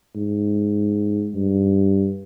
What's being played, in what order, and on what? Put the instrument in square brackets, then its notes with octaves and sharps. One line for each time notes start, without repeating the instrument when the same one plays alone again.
[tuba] G#2
G2